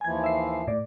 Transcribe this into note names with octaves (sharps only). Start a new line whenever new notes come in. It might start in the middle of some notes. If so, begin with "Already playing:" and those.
D#2 E3 F3 G#5 G#6
E5 C7
A2 D5